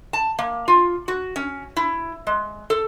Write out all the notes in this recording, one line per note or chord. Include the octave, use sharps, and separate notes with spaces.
A5
A#3
F4
F#4
C#4
E4
G#3
A4